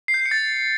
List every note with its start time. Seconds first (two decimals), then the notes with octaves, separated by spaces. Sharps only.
0.08 C7
0.14 G6
0.20 C7
0.26 C#7
0.31 A6